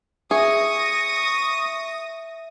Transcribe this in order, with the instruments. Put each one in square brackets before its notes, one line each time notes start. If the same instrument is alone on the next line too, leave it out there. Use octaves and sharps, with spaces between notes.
[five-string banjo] G#4 [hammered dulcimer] E5 [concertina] C#6 [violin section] D#6 A#6